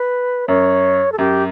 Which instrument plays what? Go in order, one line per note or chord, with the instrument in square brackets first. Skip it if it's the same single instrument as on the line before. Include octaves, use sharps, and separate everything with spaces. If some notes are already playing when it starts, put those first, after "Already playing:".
Already playing: [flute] B4
[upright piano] F#2 [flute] C#5
[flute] A4
[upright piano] F#2 [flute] G4